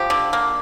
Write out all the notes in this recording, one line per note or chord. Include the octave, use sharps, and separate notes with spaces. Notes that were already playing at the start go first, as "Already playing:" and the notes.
Already playing: F3 G4
D3
A#3